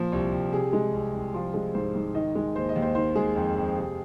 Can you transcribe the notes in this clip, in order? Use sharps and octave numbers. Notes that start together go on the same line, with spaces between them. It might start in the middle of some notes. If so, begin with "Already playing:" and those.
Already playing: A#2 F3
C2
C2
C3 G#4
G#3
C2
C2
F3 F4
G#3 G#4
G#2 C5
G#2
D#3 D#5
G#3
D#2 C5
D#5
D#2
C5
D#3 C5
G#3 G#4
F2
F2
C3